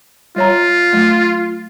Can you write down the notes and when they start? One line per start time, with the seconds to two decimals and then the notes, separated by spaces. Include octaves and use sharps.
0.36 G3 F4 C#5 A#5
0.93 F#3 A3